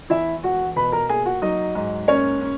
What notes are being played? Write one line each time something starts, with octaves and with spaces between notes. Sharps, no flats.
E2 E4 E5
E1 F#4 F#5
B2 B4 B5
A#4 A#5
A#3 G#4 G#5
F#4 F#5
F#3 D#4 D#5
G#2
A#3 C#4 C#5
C#4